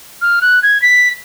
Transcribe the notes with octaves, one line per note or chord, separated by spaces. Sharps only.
F6
F#6
G#6
B6